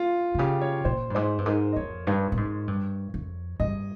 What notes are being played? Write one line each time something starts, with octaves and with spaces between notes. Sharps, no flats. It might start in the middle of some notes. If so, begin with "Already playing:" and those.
Already playing: F4
C3
C#3 G4
C#5
A#2 C5
G2
G#2 C5
G2
G#2 A#4
D#5
F2 C#5
G2
A#2
G#2
G2
F2
G2 D#5